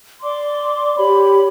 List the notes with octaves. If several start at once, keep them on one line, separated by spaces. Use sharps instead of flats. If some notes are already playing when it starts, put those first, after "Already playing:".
D5 C6 D6
G4 C#5 B5